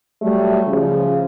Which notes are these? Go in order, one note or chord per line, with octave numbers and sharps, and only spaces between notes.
F#3 G3 A3
C#3 F3